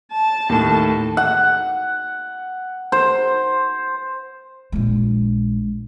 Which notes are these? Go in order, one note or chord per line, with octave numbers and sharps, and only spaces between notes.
A5
D#2 A2
F#5
C5
A#1 G#3